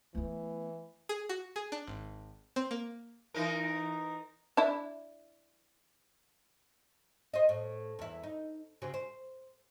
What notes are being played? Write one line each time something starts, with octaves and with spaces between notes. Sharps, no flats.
E3 A3 B3
G#4
F#4
G#4
D4
G#1
C4
A#3
E3 D#4 A#4
D4 E4
C5 D#5
A2
E2 E4
D#4
C#3 C4 F#4
C5